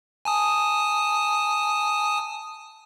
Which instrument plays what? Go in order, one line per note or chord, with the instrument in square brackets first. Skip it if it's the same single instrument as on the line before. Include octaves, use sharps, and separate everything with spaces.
[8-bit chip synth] G#5 A5 D#6